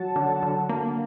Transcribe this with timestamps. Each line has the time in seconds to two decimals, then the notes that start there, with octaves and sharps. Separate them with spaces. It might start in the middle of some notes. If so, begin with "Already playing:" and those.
Already playing: F#3 F#5 A5
0.16 D3
0.43 D3
0.69 A#3